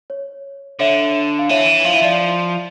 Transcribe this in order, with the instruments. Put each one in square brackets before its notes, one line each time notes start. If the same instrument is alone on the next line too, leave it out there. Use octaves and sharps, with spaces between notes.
[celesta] C#5
[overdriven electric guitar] D3 [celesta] C#5 E5
[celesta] F5
[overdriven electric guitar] E3 [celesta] C#5 E5
[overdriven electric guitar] F3 [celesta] F5
[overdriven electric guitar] E3 [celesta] E5
[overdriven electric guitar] F3 [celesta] D5 F5